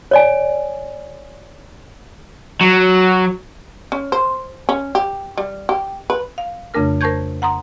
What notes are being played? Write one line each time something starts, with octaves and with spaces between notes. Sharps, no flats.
C#5 D5 G#5
F#3
C#4
C5
C#4
G4
G3
G4
B4
F5
F2 C#3 A3 D4 A#4 F6
A#4 C5 A5 C#6 G6 G#6
F#5 A#5 C6 D#6